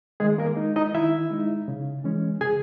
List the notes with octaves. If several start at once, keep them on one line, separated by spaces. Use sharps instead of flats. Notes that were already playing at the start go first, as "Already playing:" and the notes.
D#3 G#3 G#4
A#3 A#4
G#3 D#4
D#4 D#5
D#3 E4 E5
G#3 D#4
C#3
E3 G#3 C#4
C#3 G#4 G#5